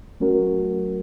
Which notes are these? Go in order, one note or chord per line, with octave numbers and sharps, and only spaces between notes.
F#3 A3 C#4 F#4 A#4